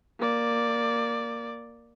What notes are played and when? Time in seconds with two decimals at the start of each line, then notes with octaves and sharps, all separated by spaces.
0.20 A#3 D5